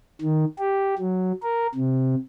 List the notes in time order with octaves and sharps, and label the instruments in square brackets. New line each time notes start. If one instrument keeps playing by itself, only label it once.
[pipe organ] D#3
G4
F#3
A#4
C3